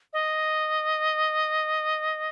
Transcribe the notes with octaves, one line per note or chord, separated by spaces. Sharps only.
D#5